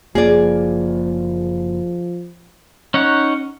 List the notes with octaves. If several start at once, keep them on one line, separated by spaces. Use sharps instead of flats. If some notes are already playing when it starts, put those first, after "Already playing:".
F#1 F3 A#3 G#4 D5
C#4 D#4 C#5 F#5